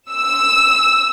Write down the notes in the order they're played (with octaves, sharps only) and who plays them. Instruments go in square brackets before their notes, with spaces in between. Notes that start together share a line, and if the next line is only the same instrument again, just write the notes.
[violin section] E6